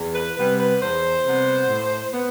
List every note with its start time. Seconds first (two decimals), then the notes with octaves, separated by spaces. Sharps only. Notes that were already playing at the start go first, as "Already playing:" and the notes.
Already playing: E2
0.14 B4
0.36 C3 G3 B3 B4
0.58 B4
0.80 E2 C5
1.24 C3 G3 B3
1.68 A2
2.13 B3